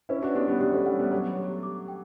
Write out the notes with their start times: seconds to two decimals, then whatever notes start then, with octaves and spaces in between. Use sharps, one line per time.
0.09 C#4 E4 B4
0.22 D4 F#4
0.35 B3 D4 G4
0.47 G3 B3
0.61 G3 B3 G4
0.73 A3 C#4
0.86 G3 B3 F#5
0.99 G3 B3
1.11 F#3 A3 C#5
1.37 G4
1.63 D6
1.88 G5